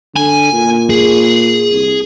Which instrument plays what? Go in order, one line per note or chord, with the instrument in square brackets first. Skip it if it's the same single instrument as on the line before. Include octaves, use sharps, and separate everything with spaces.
[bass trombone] D3 [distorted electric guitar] G#5
[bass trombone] A#2
[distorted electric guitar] G#4
[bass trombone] C2